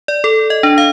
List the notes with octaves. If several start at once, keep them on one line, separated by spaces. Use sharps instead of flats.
D5
A4
D#5
D4
F5